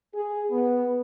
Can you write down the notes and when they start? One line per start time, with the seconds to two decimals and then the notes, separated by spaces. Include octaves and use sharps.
0.15 G#4
0.51 B3